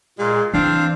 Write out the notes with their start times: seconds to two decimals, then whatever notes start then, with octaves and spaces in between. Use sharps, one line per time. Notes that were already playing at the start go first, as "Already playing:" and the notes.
0.18 A#2 G#3
0.54 E3 C4 D4 F5